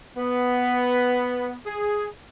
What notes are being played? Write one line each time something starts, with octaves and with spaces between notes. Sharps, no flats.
B3
G#4